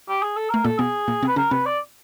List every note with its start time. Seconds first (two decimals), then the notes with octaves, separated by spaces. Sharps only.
0.09 G4
0.22 G#4
0.36 A4
0.50 A3 A#4
0.64 A#2 A#3 A4
0.79 B2 B3 G#4
1.08 A#2 A#3
1.22 C3 C4
1.28 B4
1.36 C#3 C#4 A#4
1.51 C3 C4 B4
1.66 D5